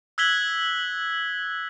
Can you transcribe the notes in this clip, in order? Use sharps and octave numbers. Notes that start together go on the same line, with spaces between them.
E6 F#6 G#6 B6 F#7 G7